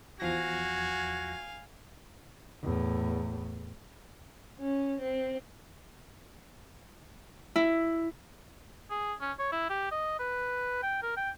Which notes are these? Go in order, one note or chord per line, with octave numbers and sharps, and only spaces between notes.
E2 F3 F#4 F5 G#5 G#6 A#6
E2 A2
C#4
C4
E4
G#4
C#4
C#5
E4
G4
D#5
B4
G5
A#4
G5